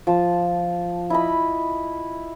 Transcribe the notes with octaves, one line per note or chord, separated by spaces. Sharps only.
F3 A5
E4 D#5 B5